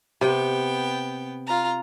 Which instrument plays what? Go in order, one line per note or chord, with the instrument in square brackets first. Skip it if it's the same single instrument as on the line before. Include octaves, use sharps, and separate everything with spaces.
[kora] C3 [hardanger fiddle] B3 G5
[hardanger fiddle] F4 A#5